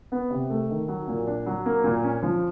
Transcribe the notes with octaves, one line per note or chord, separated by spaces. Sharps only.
B3
C3
A3
D#3
F#3
A#2
D4
F#3
A#3
A#2
C#4
F3